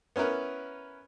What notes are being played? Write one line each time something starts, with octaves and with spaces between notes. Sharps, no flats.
B3 C#4 E4 A#4 B4